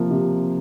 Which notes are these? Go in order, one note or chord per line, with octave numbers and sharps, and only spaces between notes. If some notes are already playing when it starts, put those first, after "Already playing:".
Already playing: C3 F3 A#3
C3